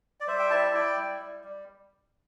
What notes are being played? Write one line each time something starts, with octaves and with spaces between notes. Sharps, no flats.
D5
G3 C5 E5
G5
E4 E5 A5
E5
E4 D5 G5
G3
G3
G3